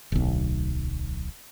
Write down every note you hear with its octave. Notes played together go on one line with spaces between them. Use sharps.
D1 B1